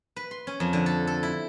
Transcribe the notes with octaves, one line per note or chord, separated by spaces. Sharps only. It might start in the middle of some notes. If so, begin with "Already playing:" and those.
B4
C6
C#4
F2
D3
A4
A4
E4